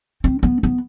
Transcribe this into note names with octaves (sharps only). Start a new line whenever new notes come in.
C4
B3
B3